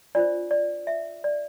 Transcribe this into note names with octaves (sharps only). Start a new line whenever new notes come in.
D4 F4 C5 D5
D5
E5
D5